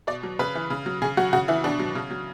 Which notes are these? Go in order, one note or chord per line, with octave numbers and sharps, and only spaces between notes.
B2 D5
F#3
C#3 B4
E3
C#3
F#3
C#3 G#4
F#3 F#4
C#3 F#4
E3 E4
B2 D4
F#3
C#3
F#3